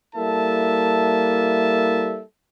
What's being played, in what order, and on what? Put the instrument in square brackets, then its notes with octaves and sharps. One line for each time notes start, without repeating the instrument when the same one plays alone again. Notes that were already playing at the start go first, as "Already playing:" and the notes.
[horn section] G3 A#3 E4 A4 E5 A5